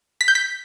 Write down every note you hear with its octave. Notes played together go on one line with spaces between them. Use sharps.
B6
G6
B6